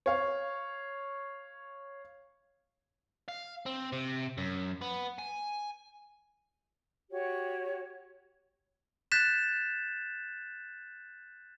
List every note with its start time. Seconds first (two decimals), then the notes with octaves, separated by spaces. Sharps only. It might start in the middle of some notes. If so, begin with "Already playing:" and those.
0.06 C#5 F5
3.29 F5
3.66 C4
3.92 C3
4.38 F#2
4.81 B3
5.18 G#5
7.11 F#4 G4 C#5
9.12 F#6 G6 A6 B6 E7